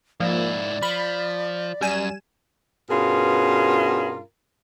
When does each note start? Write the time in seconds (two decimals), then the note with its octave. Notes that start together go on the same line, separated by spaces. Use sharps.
0.20 G#2 F3 A#3 E4 D5
0.83 F3 B5
1.81 F#2 G3 G#5 E7
2.90 G2 B2 C#4 F4 G#4 A#4